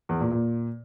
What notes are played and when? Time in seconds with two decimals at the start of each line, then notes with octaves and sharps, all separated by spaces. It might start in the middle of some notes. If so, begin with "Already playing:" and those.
0.09 E2
0.20 A#2
0.31 A#2